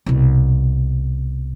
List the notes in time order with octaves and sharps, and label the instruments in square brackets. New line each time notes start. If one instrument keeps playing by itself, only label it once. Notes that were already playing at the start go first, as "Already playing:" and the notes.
[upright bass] C2 B2